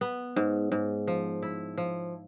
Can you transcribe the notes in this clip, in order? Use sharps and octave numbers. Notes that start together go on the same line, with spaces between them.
B3
G#2
G#2
F3
E4
F3